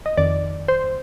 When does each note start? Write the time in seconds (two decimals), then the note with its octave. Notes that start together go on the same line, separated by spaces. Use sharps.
0.06 D#5
0.17 F2 D#3 D5
0.68 C5